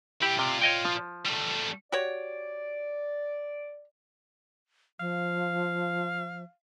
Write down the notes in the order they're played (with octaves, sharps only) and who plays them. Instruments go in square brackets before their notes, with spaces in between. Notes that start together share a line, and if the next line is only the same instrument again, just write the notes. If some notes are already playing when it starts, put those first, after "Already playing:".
[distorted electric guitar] E4 G5 [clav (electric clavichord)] G4
[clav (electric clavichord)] C3 [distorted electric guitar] F4 D5
[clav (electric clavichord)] C#5 D#5 G5
F3
[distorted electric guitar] G3 A3
[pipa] F#4 G4 C#5 [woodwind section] D5
[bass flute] F3 [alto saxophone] F5